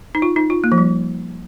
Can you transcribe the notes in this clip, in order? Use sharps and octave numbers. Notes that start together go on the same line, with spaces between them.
D#4
F4
D#4
F4
A#3
F3
G3